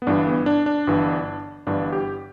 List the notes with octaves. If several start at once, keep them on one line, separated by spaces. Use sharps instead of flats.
B3
G1 G2 E3 D4
B3
D4
D4
G1 G2 E3
G1 G2 E3 D4
G4